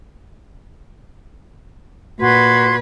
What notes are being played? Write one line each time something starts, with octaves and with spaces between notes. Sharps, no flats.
A#2 F#4 B4 C6 G#6